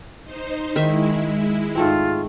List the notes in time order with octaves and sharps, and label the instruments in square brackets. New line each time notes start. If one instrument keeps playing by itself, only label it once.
[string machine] D#4 C5
[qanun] D#3 E5 [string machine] G#3 E4
[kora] G#2 A3 C4 [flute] F4